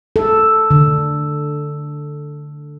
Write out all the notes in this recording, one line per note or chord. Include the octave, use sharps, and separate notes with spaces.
A4
D3